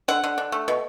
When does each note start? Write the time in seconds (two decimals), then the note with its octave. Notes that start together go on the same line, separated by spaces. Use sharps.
0.08 D3 F#5
0.24 D3
0.38 D4
0.52 A3
0.68 B2